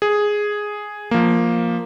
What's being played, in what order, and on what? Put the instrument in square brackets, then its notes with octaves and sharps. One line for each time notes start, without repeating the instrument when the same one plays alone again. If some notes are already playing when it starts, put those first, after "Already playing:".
[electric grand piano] G#4
F3 A#3